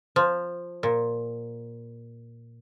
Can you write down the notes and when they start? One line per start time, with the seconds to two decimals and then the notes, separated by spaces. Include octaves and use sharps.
0.16 F3
0.83 A#2